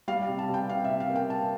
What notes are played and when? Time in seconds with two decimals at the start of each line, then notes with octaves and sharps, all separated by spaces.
0.08 G3 F5
0.28 C3
0.39 A5
0.49 G3 G5
0.69 C3 F5
0.84 E5
0.90 C3
1.00 F5
1.10 A#3
1.16 G5
1.30 G3 A5